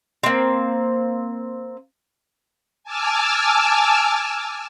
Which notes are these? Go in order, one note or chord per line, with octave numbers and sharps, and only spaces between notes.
A#3 C4
G#5 A5 D6 E6 F6